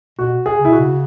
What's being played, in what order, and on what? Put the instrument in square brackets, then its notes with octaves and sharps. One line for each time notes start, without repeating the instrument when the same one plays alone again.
[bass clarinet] B2 [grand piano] F#4
[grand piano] G#4
[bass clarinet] C#3
[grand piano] E4
[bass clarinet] B2
[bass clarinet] C#3 [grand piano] F#4